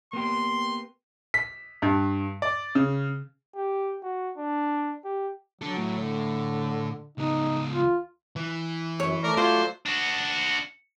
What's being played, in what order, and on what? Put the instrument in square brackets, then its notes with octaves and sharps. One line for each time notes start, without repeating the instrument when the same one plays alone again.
[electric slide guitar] A#3 B3 G4 [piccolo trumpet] C6
[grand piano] B6
G2
D5
C#3
[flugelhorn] G4
F#4
D4
G4
[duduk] F#3 [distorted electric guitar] D4 A4
[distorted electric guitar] A2
[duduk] D3
[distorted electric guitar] C#2 B3 [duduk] D#4
[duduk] F4
[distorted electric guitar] E3
[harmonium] F#2 [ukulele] C#5
[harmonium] A3 D5 [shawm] A#4
[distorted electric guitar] F#3 [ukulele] F4 [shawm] C5
[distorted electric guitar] D4 F#4